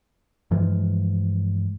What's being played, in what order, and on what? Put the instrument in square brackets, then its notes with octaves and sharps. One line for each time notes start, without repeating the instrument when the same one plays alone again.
[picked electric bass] G2 E3 F3 G#3